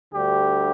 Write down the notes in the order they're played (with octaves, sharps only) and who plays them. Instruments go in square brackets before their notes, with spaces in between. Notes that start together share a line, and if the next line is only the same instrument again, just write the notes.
[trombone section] D2 D3 G3 G4